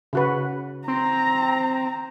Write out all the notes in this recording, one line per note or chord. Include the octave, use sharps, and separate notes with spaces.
C#3 F#4 B4
C4 A#5